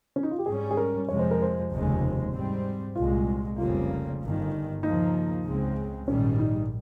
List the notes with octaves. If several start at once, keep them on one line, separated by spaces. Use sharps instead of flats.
C#4
D#4
F4
G4
G#2 G3 C#4 G#4
G#4
A#4
F2 C3 F3 G#3 C#5
C5
A#4
C5
F1 D#2 C#3 G#3
G#2 G3 C4
C2 A#2 G#3 F4
F1 F2 C#3 G3 A#3 F4
G1 G2 D#3
D#2 C#3 F3 A#3 D#4
C#2 C#3 G#3 C4
A#1 G#2 D#3 G3 C#4
D#4